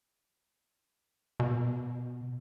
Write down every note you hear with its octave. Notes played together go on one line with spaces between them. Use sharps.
B2